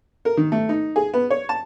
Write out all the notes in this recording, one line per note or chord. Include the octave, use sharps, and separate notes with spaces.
A#4
D#3
A3
D#4
G#4
B3
C#5
A5